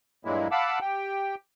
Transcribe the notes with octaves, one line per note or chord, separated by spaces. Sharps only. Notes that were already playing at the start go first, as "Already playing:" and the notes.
G2 A#2 F#3 G#3 A#3 E4
F5 F#5 A5 B5 D6 E6
G4 G5